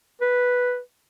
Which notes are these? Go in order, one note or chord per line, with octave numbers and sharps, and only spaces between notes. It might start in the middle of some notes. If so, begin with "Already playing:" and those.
B4